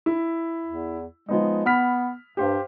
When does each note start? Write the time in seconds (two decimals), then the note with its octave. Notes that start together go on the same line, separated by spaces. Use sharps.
0.06 E4
0.66 E2
1.29 F3 G#3 B3 D#4
1.66 B3 B5 F6 B6
2.37 G2 G4 C5 F5